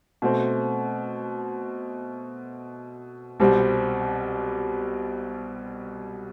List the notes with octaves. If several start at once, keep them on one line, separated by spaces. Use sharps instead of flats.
B2 A3 C4
C2 B2 G3 C4